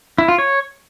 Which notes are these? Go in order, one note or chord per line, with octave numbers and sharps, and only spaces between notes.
E4
F4
C#5